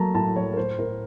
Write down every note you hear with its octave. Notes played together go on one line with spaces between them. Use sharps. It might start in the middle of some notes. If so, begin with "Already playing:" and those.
Already playing: F#3 A3 A#3 A5 A#5
A2 A5
F#3 C#5
A#4
A2 C5
A2 A#4